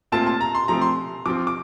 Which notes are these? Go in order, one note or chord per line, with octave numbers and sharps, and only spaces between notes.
A#2 A3 C4 F4 A5
A5
A#5
C6
F3 A3 C4 A#5
C6
F3 C4 F4 D6
D6